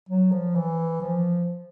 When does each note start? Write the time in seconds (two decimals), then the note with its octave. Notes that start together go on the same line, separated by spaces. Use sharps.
0.09 F#3
0.32 F3
0.55 E3
1.01 F3